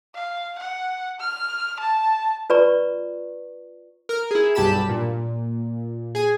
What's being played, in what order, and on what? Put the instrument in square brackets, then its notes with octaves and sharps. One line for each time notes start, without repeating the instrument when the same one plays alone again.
[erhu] F5
F#5
F6
A5
[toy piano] F4 B4 D5 A#5 C#6
[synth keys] A#4 F6
E4 G#4
B1 G2 G4 A5 B5 E7
A#2
G#4 G#5